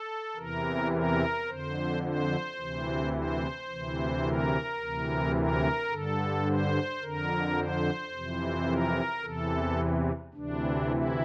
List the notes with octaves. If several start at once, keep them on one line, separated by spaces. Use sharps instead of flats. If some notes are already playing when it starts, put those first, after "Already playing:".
Already playing: A4
E2 C3 E3 A#4
A#4
F2 D3 C5
C5
D2 C3 E3
C5
D2 C3 E3
A#4
D2 C3 E3
A#4
G2 D3 A4
C5
F2 D3 A#4
C5
F2 C3 E3
A#4
E2 C3 E3 A4
D2 C3 E3 D4
E4